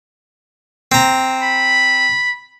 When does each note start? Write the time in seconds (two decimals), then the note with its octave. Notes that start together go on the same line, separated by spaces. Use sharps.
0.92 C4 A#5
1.43 B5